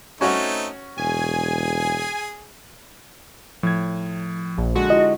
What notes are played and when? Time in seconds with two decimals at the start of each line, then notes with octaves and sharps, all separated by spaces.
0.21 A3 C4 C#4 D#4 F#4 C#5
0.98 E1 G#4 G#5
3.63 A2 F3 G#6
4.58 A#1
4.75 D3 G#3 F#4
4.90 E4 F4 D#5